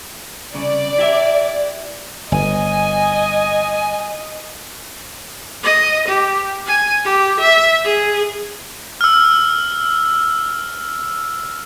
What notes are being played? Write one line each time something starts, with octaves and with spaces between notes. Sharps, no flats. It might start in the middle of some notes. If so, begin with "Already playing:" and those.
C2 C#3 D5
E4 G4 E5
G1 D#5 G#5
D#5
G4
G#5
G4
E5
G#4
E6 F6